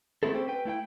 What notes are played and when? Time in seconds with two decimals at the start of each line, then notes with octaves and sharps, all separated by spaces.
0.23 A3 C4 E4 G#4 A4
0.34 C4 C#4 G4 A4 C5
0.48 B4 G5
0.65 A3 E4 F5 G5